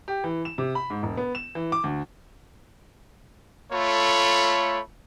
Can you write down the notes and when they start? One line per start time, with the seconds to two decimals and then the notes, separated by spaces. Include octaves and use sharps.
0.08 G4
0.24 E3
0.45 E7
0.58 C3
0.75 B5
0.90 G#2
1.03 E1
1.17 B3
1.35 E7
1.55 E3
1.72 D6
1.84 D2
3.72 A3 F4 A4 C#5 B5